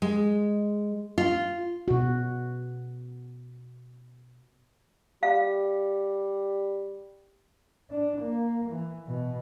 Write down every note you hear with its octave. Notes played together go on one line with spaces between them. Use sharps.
G#3
F4
B2 F#4
G3 F5
D4
A#3
E3
B2